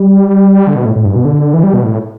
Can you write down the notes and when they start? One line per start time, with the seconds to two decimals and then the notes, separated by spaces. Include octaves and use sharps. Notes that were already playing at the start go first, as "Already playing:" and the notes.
Already playing: G3
0.67 D3
0.76 B2
0.85 A2
0.96 A2
1.05 G2
1.16 B2
1.25 D3
1.54 E3
1.63 G3
1.74 B2
1.83 A2